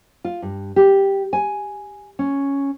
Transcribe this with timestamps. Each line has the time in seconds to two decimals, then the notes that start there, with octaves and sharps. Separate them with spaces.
0.25 F4
0.42 G2
0.76 G4
1.33 G#5
2.19 C#4